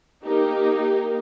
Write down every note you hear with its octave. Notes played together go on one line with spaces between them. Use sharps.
A#3 D#4 G4